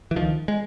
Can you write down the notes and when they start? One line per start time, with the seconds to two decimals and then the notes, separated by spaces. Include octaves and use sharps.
0.11 E3
0.16 C#2 D#3 F3
0.48 G#3